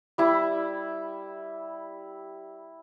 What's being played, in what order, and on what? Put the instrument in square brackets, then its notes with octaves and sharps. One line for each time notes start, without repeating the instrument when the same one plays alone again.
[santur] G3 E4